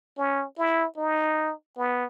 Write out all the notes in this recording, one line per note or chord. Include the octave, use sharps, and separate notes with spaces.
C#4
E4
D#4
B3